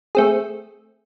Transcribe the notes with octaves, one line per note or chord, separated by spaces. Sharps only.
A3 C4 G#4